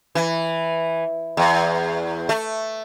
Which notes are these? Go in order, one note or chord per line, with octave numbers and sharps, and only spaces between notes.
E3
E2
A3